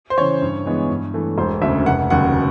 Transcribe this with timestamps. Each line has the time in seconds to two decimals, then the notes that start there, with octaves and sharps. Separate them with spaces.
0.10 C5
0.18 C#3 E3 C#5
0.42 G2
0.66 E3 G#3 B3
0.89 G2
1.14 E3 A3
1.38 E1 C5
1.62 D2 C#3 E5
1.86 F1 F#5
2.10 D#2 C#3 F#3 F#5